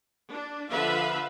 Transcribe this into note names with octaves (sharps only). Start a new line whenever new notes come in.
D4
D3 F3 B4 E5 F5 B5